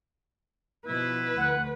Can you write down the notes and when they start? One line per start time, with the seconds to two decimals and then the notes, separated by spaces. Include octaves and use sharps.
0.87 B2 F3 E4 B4
1.37 D2 F#5